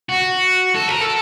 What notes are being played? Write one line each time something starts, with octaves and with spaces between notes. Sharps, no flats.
F#4
A4
A#4
A4